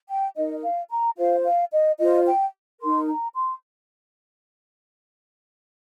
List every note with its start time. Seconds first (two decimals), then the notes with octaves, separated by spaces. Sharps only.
0.09 G5
0.36 D#4 A#4 D#5
0.64 F5
0.90 A#5
1.17 F4 C5 F5
1.45 F5
1.72 D#5
1.99 F4 C5 D#5
2.26 G5
2.80 D#4 A#4 C6
3.09 A#5
3.35 C6